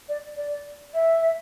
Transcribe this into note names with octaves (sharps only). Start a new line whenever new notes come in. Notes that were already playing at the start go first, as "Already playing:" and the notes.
D5
D5
E5